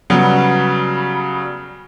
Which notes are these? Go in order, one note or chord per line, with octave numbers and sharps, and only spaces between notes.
C#3 F#3 G3 B3